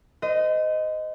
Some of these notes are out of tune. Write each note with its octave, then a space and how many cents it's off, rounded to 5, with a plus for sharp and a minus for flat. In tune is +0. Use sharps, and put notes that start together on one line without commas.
C5 -40 D#5 +0